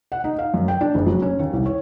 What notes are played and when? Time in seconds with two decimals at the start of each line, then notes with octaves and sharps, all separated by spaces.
0.12 F#5
0.24 D#4
0.39 F5
0.54 F#2
0.68 G5
0.81 D4
0.95 F#1
1.06 F#3
1.22 C#4
1.39 D#2
1.53 C2
1.66 C#5